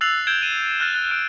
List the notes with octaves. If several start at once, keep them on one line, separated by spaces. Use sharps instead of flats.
E6 F#6 A6 C7 F7 F#7
E6 G6 G#6 D7 E7 G7
D#7 E7
F6 F#6 G#6 A6 D#7
F#6
F6 D7